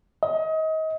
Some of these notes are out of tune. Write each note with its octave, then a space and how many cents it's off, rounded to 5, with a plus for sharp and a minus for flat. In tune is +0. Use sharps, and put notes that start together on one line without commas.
D#5 +30